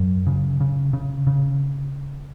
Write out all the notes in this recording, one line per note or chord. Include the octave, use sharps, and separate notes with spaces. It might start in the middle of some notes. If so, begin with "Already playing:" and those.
Already playing: F#2 F#3
C#3
C#3
C#3
C#3